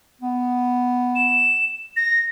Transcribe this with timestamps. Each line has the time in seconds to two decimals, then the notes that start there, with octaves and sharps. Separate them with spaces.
0.21 B3
1.16 E7
1.96 A#6